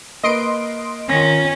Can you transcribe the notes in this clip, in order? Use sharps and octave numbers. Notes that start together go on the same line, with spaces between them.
A#3 B4 D#5 C6 D7
D#3 C#4 F4 A#6